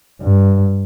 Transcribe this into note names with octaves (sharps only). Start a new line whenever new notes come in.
G2